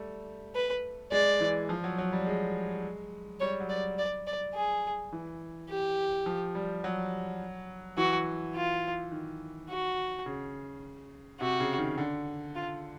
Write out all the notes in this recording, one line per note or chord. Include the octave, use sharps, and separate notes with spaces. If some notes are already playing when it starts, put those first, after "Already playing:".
Already playing: G3 A3
B4
G#3 D5
E3
F3
F#3
F#3
G3
G#3
G3 C#5
F#3
D5
D5
D5
G#4
E3
G4
F3
G3
F#3
E3 F#4
F4
D#3
F#4
C#3
C3 F#4
C#3
D#3
D3
F4